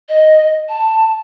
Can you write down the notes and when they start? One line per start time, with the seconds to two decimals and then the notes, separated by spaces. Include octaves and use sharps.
0.09 D#5
0.69 A5